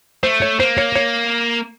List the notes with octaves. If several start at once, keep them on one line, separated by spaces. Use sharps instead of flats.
A3 C5
C#5
A#3 C5
C#5
C#5